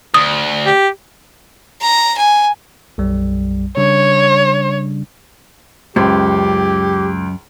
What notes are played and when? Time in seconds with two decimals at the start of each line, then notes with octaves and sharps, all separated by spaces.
0.14 D2 D#6
0.66 G4
1.82 A#5
2.18 G#5
2.98 B1 F#2 G3
3.77 C#3 G3 D4 C#5
5.96 C#2 F#2 G4 C5